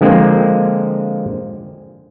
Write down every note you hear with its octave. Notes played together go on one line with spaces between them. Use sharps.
D3 F3 G#3 A#3 C4